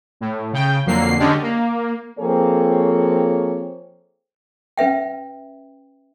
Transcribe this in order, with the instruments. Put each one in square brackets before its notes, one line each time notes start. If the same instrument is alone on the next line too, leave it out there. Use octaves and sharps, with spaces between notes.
[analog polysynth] A2
C#3 G5
F2 D3 F#3 A#3 C7
D3 G#3 C#4 D4 G4
A#3
[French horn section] F3 A#3 C4 G#4 A4 C#5
[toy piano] C#4 B4 E5 G5